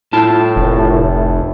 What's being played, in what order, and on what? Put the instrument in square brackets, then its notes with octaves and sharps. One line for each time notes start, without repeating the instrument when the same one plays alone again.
[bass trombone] A2 [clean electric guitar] E4 F4 A5
[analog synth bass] F1